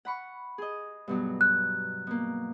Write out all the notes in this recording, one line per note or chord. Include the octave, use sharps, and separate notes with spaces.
F#5 B5 C#6
G#4 D#5
G2 B2 F#3
F#6
B2 A#3